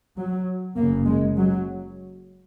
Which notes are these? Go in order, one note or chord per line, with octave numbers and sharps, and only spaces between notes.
F#3
F#1 F#2 C#3 A#3
G#3
F#3